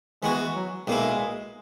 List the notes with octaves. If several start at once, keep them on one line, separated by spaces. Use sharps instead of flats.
E3 G#3 B3 F#4
F#3
B1 A#2 G#3 A#3 E4